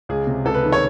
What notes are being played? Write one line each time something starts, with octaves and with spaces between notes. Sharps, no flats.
C#2 G#4
C3
C#2 A4
B4
D#3
C#5